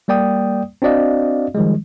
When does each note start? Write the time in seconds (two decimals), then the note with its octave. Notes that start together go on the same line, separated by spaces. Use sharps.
0.08 G3 A#3 D5 G5 D#6
0.82 C4 D4 F#4 D5 D#5 F5
1.55 D#3 F3 G3 G#3